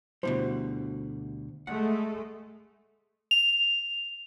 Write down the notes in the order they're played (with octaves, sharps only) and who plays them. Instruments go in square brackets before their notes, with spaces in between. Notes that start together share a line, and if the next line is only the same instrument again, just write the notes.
[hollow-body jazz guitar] D2 B2 G3 [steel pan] E4 C5
[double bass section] G#3 A3 [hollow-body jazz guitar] F#5
[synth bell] F7